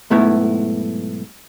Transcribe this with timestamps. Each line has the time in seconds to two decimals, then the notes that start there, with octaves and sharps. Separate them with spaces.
0.10 B1 G#2 A3 B3 E4